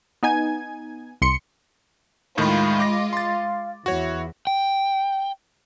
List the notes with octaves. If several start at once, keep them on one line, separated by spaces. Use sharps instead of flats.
B3 D#4 G#5 G#6
C2 C6 C#7
D#2 A2 D#3 G#3 F4 D#5 B5
D6 A#6
F5 C6 A6
E2 E4 F#4 C#5
G5